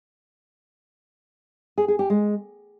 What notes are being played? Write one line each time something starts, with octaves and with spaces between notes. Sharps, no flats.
G#4
G#4
G4
G#3